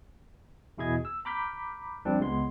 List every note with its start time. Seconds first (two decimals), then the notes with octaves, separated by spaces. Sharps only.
0.78 E2 B2 E4 G#4 D#5 G#6
1.05 E6
1.25 A#5 B5 D6 F6 G6 B6
2.05 F3 G3 C4 D4
2.20 C#2 G#3 B3 C6